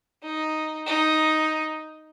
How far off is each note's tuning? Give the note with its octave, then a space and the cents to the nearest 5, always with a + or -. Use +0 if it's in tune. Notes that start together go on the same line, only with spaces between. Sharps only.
D#4 +0
D#4 +5